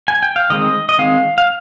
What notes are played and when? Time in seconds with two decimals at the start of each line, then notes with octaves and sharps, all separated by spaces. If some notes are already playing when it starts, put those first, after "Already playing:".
0.08 G#5
0.23 G5
0.36 F5
0.50 D#3 G#3 C4 D#5
0.89 D#5
0.98 D#3 G#3 C4 F5
1.38 F5